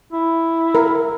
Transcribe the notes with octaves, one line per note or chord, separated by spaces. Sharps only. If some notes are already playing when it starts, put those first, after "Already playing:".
E4
A#4